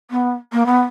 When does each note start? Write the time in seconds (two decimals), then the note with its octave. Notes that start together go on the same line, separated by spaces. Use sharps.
0.11 B3
0.53 A#3
0.66 B3